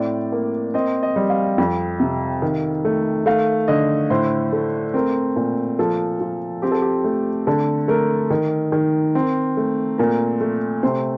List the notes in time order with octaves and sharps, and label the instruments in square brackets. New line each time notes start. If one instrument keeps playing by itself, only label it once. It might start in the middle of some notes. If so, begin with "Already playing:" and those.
Already playing: [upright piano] A2 C4 D5
A#3
C4 D#5
D#5
G3
F5
F2
C3
D#3
A3
A3 F5
D3 D#5
A2 C5
A3
C4 A#4
A#2
F3 A4
F3
C4 G4
A4
G4
A3
D3 A4
A3 A#4
D#3
D#3
C4
A3
A#2 A#4
A3
C3 C5